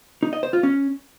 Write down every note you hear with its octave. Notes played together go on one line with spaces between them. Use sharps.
D#4
D#5
C5
F4
C#4